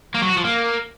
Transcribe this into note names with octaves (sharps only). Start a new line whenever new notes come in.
A#3
F#3
F#4
F3
A#3